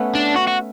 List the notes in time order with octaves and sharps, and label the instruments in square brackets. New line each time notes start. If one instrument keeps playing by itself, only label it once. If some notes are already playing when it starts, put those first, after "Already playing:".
Already playing: [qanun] A3 B3 C#4
[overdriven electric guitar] D4
F#4
F#4